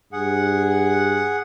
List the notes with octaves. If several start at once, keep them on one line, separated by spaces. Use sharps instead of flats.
G2 G#4 F#5